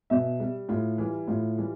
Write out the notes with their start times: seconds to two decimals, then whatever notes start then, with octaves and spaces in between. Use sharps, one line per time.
0.10 B2 E5
0.40 G3
0.69 A2 F4
0.98 E3 G3
1.27 A2 F4
1.57 E3 G3